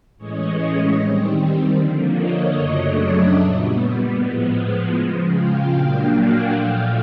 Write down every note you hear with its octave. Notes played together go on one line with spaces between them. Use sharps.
A2 E3 G#3 C#4 C#5 D#5
D#3 G3 C4
D3 F3 A#3
C#5 D#5
F#2 C#3 F#3 A3 D4
D5 E5
A#2 G3 B3
A2 F3 G#3 B3
C#3 F3 G#3
F5 G5
A#2 F#3 A#3 D4
F#5 G#5
A#2 F3 A3 F5 G5